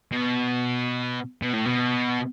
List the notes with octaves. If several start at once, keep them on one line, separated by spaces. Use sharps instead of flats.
B2
B2
A2
B2